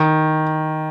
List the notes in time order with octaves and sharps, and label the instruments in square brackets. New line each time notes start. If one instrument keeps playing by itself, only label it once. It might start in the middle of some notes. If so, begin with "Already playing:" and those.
Already playing: [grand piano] D#3